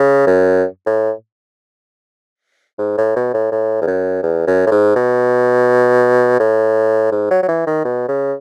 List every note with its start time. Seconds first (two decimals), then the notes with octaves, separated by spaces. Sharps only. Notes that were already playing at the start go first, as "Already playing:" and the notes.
Already playing: C#3
0.26 F#2
0.86 A2
2.78 G#2
2.97 A2
3.16 B2
3.34 A2
3.51 A2
3.82 E2
3.87 F#2
4.23 E2
4.47 F#2
4.66 A2
4.71 G#2
4.95 B2
6.39 A2
7.11 G#2
7.31 F#3
7.42 F#3
7.48 E3
7.67 D#3
7.84 B2
8.08 C#3